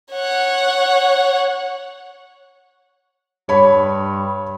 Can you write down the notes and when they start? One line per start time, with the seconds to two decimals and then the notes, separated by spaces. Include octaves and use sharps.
0.12 C#5 F#5
3.49 G2 C#5 B5